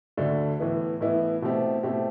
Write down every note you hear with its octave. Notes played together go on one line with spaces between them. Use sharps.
D2 D3 A3 D4
A2 E3 B3 E4
A2 E3 B3 E4
B2 A3 C4 E4 G4
B2 A3 C4 E4 G4